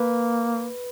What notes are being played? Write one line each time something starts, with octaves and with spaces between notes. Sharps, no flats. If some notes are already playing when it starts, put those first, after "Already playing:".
Already playing: A#3 B4